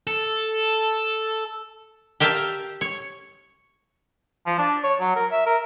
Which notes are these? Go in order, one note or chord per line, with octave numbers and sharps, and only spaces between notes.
A4
G4 A#4 E5 F5 A5
C#5
F3
D4
C#5
F#3
A#4
E5
A#4